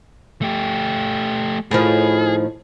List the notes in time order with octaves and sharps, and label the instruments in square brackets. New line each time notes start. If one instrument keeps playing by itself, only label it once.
[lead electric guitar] A3 G4
[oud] A2 D#3 F3 [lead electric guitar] G#4